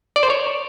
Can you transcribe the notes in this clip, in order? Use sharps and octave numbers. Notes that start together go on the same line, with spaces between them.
D5
C5
C#5